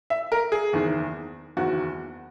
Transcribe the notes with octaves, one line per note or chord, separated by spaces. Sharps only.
E5
A#4
G#4
F#1 E2 D#3
F#1 E2 D#3 F#4